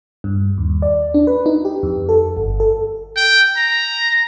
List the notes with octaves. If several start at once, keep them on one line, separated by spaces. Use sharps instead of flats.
G2
D#2
D5
D4
B4
D#4
G4
F2
A4
G1
A4
G5
A#5